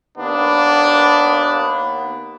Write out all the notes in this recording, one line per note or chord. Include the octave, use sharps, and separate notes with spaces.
D#2 A#3 B3 D4